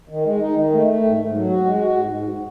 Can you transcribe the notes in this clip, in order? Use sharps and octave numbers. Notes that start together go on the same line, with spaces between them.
D#3
G#3
D#4
D#3
A3
A3
G#2
G#2
F#3
F#4
G#3
F#4
G#2
G#2